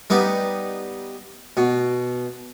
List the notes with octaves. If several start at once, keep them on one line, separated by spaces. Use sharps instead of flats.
G3 B3 D#4
B2